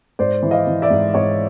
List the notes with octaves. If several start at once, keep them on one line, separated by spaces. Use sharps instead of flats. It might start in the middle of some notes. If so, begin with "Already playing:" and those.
G#2 C5 D5
E3
D#5 F5
E3
D5 E5
G#2
G#2 C#5 D#5